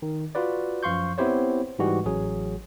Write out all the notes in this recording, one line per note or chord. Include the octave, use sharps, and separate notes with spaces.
D#3
F4 F#4 B4 D5
F#2 F3 F5 C6 C#6 G6
B3 C4 E4 G4 C5 C#5
G#2 E3 G3 G#3 F#4 G4
A1 F#3 G#4